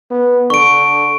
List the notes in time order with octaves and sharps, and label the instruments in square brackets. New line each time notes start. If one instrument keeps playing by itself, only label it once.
[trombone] B3
[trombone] D3 [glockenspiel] C#6 D7